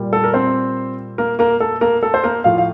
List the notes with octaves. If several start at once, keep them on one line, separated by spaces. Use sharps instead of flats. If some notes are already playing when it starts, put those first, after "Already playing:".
Already playing: A#2 G3
A4
A#4
C4 C5
A#3 A#4
A#3 A#4
A4
A#3 A#4
A4
C5
A#3 A#4
A2 F3 F4 F5
F5